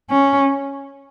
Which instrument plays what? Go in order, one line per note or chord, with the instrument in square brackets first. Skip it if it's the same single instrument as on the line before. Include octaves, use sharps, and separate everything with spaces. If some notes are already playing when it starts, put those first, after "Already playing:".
[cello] C#4